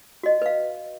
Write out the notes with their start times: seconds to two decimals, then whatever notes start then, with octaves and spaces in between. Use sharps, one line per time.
0.23 F#4 D#5
0.42 B4 F5